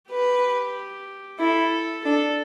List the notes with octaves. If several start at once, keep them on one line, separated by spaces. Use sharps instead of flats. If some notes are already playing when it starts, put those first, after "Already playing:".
G4 B4
E4 A4
D4 A4